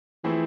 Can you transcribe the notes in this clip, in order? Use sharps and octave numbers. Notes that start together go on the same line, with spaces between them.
E3 F3 A3 C4 E4 G#4